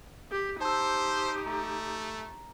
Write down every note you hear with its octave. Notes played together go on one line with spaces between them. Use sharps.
G4
D#4 G4 C5 A5 E6
A3 A#5